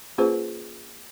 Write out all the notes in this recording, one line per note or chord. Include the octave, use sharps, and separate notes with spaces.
A#3 C#4 F4 G#4 B4 C5